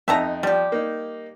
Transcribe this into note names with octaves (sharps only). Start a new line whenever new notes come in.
F2 D#4 E5 A5 A#5
F3 G3 G4
A#3 D#4